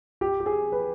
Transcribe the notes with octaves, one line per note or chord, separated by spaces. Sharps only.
G4
G4
G#4
B4